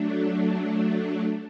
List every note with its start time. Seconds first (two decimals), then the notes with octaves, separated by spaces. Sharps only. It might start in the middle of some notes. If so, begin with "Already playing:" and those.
Already playing: F#3 A3 D4